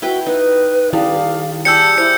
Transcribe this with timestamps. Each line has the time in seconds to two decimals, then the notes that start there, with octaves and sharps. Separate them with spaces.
0.02 E4 F#4 B4 G5
0.26 D#4 B4
0.93 D#3 G3 E4 F5
1.65 G3 G#4 A5 E6 G6 C#7
1.98 E4 C5 C#7